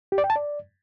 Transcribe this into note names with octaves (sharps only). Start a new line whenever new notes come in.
G4
D5
G5
A5
D5